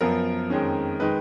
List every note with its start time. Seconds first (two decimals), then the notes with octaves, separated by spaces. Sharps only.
0.01 F#2 F3 B3 F4 A#4
0.50 F2 D#3 G#3 C#4
1.00 D#3 G#3 D#4 B4